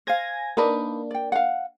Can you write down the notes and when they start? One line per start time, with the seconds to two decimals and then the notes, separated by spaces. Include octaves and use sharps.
0.07 C5 F5 G#5 G#6 A#6
0.57 A#3 D4 D#4 A#4 B4
1.11 D5 G5
1.32 F5 F#5